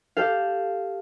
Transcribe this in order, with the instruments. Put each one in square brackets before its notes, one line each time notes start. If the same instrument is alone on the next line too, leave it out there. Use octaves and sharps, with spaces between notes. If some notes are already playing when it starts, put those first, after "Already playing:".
[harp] G4 A4 F5